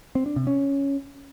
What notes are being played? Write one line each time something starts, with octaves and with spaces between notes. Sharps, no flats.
C4
D4
C3
C#4